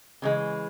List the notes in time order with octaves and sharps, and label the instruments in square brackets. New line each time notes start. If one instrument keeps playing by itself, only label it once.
[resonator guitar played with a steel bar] C#3 E3 G#3